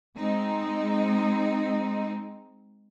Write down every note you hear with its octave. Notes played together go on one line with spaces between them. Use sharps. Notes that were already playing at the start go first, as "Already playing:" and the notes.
G#3 C4 D#4